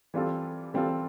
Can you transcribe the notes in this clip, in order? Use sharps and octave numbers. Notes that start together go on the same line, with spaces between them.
E3 G3 C4 F4 A4
E3 G3 C4 F4 A4